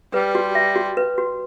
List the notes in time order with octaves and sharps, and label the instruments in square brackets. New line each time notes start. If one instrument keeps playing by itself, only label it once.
[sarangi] G3 [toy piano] B4
[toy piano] F#4
E5
F#4
B4
F#4